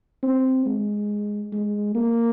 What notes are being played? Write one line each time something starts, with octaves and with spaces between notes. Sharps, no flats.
C4
G#3
G#3
A#3